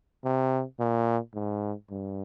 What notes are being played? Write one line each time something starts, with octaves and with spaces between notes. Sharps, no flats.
C3
A#2
G#2
G2